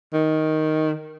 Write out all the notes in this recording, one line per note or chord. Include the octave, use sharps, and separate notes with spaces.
D#3